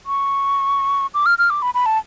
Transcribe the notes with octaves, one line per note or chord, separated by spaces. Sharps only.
C#6
D6
F6
F6
D6
B5
B5
A5